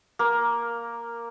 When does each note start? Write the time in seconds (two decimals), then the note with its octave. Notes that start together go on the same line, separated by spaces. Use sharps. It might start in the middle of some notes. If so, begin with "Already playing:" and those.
0.19 A#3